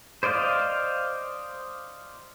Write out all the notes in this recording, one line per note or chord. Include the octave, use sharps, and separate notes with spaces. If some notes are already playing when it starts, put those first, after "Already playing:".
C5 D5 D#5 F5